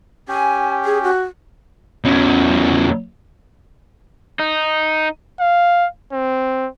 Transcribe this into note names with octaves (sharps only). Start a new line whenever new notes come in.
C#4 G4 G#5
G#4
F#4
E2 C#4
D#4
F5
C4